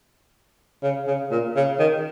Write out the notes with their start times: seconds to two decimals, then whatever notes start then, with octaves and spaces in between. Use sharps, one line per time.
0.83 C#3
1.08 C#3
1.31 A#2
1.56 C#3
1.79 D#3